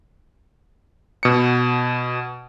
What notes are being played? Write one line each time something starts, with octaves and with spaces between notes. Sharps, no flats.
B2 C#7